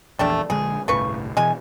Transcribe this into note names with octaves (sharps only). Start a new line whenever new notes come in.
A#1 E2 G3 A3 D4
A#1 D3 G#3 G#4
G1 C2 A2 C#3 B4 C#6
B2 E3 G#3 G#5